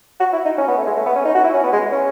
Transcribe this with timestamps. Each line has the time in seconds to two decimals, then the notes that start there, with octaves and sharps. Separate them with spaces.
0.20 F#4
0.33 E4
0.45 D#4
0.58 C#4
0.68 B3
0.77 A3
0.87 G#3
0.97 A3
1.06 B3
1.15 C#4
1.25 D#4
1.35 F#4
1.44 E4
1.54 C#4
1.63 B3
1.72 G#3
1.92 C#4